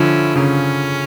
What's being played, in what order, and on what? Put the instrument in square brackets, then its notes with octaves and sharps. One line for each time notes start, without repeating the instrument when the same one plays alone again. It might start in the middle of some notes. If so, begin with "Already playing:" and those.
Already playing: [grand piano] D3 F3 [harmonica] C#4 E4
[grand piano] C#3 [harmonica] A#3 C#4